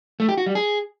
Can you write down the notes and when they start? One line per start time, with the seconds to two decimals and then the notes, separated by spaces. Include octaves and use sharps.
0.20 A3
0.29 G4
0.38 F#4
0.46 G3
0.55 G#4